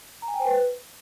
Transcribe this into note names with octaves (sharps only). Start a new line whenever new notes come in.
A#5
G#5
G5
C5
B4